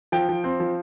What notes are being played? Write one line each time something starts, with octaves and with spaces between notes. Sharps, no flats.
F3 G5
F3
C4
F3